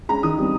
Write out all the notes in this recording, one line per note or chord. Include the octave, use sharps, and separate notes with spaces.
G#3 C#4 A#5
D#3 D#6
G3 C4 D#4